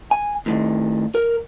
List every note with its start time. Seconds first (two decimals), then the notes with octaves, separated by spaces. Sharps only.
0.11 G#5
0.46 D#2 A2 D#3
1.15 A#4